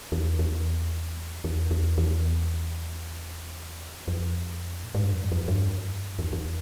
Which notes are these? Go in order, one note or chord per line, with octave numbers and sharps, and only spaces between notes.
E2
E2
F2
E2
E2
E2
F2
A#2
G#2
G2
F2
F2
G2
E2
E2